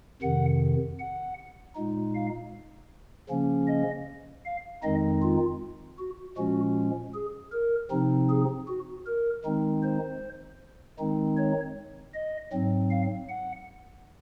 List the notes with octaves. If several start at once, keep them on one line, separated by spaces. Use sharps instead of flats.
F2 C3 D#3 F#5
F#5
A#2 G#3 D#4
F5
C#3 F3 A#3 C#4
D#5
F5
F2 D#3 G#3 C4 D#4 D#5
F4
F#4
A#2 F3 G#3 C#4 F#4
G#4
A#4
C3 F3 C4 D#4
G#4
F#4
A#4
D#3 G#3 C4 D#4
C5
D#3 G#3 C4 D#4
C#5
D#5
G#2 F#3 C4
F5
F#5